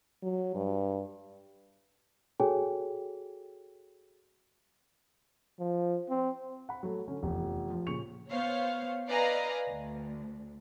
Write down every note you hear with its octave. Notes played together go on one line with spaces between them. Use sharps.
F#3
G2
F#4 G#4 A4 C#5 G5 G#5
F3
C4
F#5 B5
F#3 A3
D3 C#4
F1 E2 F3
F3
A#2 C#3 C#6 C#7 F7
B3 C5 C#5 F5
B4 D5 D#5 F5 G#5 A#5
D2